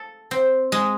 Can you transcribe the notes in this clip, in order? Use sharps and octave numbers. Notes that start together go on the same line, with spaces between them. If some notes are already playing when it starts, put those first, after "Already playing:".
Already playing: A4
C4
G#3